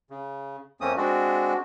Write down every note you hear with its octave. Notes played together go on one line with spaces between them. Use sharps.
C#3
F2 A3 A#3 C4 C#4 D#6
G#3 C4 D4 F#4